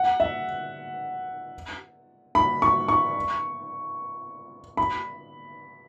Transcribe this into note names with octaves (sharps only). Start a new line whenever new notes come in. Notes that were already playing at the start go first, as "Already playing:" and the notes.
Already playing: F#5
E5
B5
C#6
C#6
B5